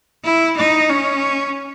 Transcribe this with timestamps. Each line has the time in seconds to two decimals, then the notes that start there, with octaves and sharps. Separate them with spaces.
0.25 E4
0.57 D#4
0.89 C#4